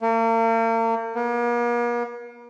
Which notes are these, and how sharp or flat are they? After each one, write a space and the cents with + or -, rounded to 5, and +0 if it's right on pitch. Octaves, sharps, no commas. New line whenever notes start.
A#3 -40
A#3 +45